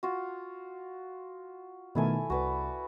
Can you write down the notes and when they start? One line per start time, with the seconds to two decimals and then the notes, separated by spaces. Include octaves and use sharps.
0.03 F4 F#4
1.95 B2 D#3 A3 E4 A4 G#5
2.30 C2 F#4 B4 D5